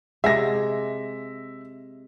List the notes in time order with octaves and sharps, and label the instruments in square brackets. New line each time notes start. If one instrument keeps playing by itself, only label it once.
[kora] C3 G#3 [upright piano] E5 A#6